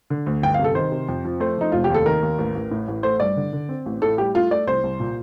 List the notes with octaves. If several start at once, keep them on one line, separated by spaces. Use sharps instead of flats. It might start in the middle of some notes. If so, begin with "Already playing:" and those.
D3
D2
G1 G5
F5
C3
A4
D#3 C5
C3
F2
F3
A3 C5
F3 D#4
F1 F4
G4
D#2 A4
D#3 A#4
D#2
A1
A1
A2
A1
A3 C5
G2 D5
D3
D3
C4
A1
A2 A4
G3 G4
A3 F4
A3 D5
C2 C5
C2
A#2